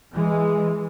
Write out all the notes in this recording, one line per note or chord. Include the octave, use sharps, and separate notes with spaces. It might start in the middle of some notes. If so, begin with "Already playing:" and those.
E3 G#3